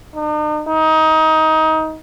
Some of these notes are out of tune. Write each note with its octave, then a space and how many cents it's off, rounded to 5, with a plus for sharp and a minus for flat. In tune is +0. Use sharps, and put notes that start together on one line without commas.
D#4 -45
D#4 +20